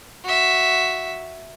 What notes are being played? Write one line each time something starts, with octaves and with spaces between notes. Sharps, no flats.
F#4 E5